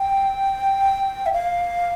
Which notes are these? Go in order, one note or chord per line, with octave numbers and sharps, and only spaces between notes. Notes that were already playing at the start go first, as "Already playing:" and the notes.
Already playing: G5
E5
F5